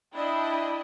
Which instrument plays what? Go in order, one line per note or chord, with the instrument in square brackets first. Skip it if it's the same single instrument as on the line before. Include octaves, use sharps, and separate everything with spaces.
[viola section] D4 E4 D#5 [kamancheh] G5 B5